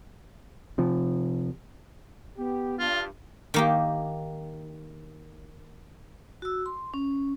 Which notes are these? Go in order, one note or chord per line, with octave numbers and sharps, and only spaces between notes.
C3 F3
B3 G4
G2 F4
D#3 A#3 G4
F#4 E6
C6
C#4